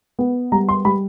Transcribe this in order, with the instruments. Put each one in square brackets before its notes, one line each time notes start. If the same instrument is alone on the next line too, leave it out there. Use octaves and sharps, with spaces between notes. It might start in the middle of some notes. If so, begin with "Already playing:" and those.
[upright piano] B3
G3 A#5
C6
G3 B5